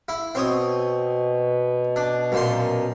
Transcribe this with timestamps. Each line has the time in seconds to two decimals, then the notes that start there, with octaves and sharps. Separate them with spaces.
0.08 E4
0.35 B2 C4 C#5 D#6
1.96 D4
2.32 F#2 A#2 C6